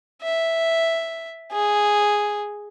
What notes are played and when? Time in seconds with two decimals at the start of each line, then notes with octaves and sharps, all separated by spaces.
0.22 E5
1.52 G#4